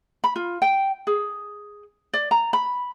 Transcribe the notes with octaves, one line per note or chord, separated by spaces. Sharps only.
B5
F4
G5
G#4
D5
A#5
B5